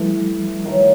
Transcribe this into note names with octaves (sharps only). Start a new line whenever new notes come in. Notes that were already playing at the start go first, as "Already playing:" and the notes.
Already playing: E3 F3 G3 A3
D#3 F#3 A3